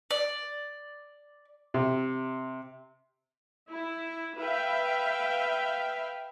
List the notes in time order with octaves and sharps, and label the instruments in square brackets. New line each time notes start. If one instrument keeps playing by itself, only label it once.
[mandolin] D5
[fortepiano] C3
[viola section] E4
B4 E5 F5 G5